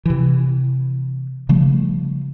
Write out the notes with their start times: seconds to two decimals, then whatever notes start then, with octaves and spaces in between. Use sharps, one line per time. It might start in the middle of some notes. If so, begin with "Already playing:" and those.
0.05 C3 E3
1.49 C#3 F3 G3 A3